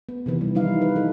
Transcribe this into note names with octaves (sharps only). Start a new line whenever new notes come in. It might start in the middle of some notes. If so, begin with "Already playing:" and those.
B3
C3 D#3 E3
G3
F3 G3 D#4 E4 F5
B4
D#4 A4